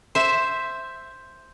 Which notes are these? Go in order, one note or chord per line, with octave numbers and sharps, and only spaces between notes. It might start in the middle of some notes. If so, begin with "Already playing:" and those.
C5 E5